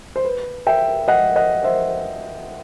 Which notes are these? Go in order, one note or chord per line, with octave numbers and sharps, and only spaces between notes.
C5
B4
E5 G5
D#5 F#5
D#5 F#5
C5 E5